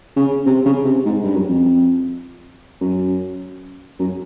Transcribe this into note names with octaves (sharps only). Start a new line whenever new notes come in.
C#3
C3
C#3
C3
G#2
G2
F#2
F2
F#2
F#2